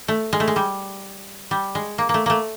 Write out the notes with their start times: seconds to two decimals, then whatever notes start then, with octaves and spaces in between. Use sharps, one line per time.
0.08 A3
0.33 G#3
0.40 A3
0.48 G#3
0.56 G3
1.51 G3
1.75 G#3
1.98 A#3
2.09 A3 A#3
2.26 A3 A#3